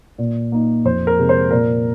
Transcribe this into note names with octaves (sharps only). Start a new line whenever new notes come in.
A#2
A#3 D#4
F2 C5
A#4
C3 G#3
C5
A#2 A#4